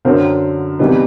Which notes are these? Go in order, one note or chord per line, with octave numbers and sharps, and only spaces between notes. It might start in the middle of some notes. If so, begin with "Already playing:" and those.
F#2 D3 F#3 A#4 C5
C3 E3 G3 B3 D#4